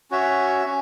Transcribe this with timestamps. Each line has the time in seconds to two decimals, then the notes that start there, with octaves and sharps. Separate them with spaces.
0.11 C#4 F#4 C#5 E5
0.65 C#4